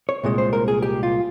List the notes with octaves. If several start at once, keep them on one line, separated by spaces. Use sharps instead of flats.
C#5
C2 A#2 G#3
C5
A#4
G#4
G4
F4